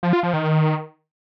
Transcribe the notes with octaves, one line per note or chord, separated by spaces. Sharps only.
F3
F4
F3
D#3